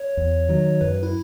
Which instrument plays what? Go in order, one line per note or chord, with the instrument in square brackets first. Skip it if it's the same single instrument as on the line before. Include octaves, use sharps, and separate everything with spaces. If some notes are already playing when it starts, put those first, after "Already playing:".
Already playing: [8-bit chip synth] C#5
[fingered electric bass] E2
D#3 F#3
[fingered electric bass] F#2 [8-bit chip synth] B4
[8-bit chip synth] E4